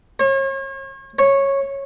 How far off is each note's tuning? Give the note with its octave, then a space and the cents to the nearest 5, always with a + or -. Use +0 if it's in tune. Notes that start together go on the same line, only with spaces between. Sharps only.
C#5 -40
C#5 -10